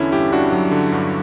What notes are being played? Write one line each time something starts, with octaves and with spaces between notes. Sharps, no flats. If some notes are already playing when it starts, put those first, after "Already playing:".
Already playing: E2 D3 C#4 E4
G2 E4 G4
G2 D4 F#4
F#3
D3
G2